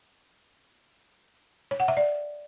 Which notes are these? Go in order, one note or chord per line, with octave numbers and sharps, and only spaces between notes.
C#5
F#5
E5
D5